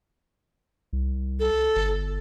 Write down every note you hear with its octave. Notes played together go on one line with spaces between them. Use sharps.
C2
A4
G1